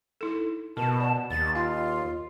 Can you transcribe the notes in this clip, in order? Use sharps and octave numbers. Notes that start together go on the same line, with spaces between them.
D#4 E4 A4
B2 A#4 A5
D5
D#2 A6
F4 F5